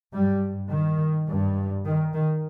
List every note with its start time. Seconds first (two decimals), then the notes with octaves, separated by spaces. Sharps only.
0.14 G2 G3
0.70 D#3
1.28 G2
1.85 D#3
2.14 D#3